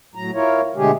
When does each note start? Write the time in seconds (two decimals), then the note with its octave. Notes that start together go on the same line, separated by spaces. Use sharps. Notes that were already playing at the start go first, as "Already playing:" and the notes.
0.15 A2 F#3 A#5
0.34 E4 F4 A#4 C#5
0.76 B2 D3 G#3 A3 G4 G#4